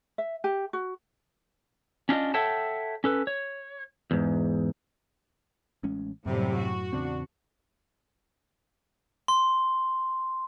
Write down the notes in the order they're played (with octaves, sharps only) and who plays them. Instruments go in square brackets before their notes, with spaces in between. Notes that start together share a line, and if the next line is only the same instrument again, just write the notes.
[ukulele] E5
G4
F#4
[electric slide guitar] C#4 D4 F4 D#5
A4 C#5 E5 F#5 G5 A5
C#4 A4 B4
C#5
E2 G#2
[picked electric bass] A1 G#3 C#4
[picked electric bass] F#2 [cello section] A2 F#3 G3 [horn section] C3
[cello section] F#4
[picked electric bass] E2 C#3 C4 [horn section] D4
[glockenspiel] C6